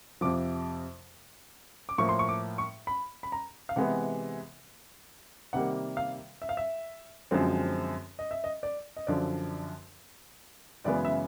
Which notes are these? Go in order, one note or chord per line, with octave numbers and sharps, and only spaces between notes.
F2 C3 F3 D6
D6
A2 F3 A#3 C#6
C6
C#6
D6
C#6
B5
B5
A#5
F5
C3 E3 G#3 B3 F#5
C3 D#3 G3 A#3 F#5
F5
E5
F5
E5
F#2 D3 F3 G#3 C4
D#5
E5
D#5
D5
D#5
F#2 D3 F3 D5
F#2 C#3 E3 G#3 B3 D5
E5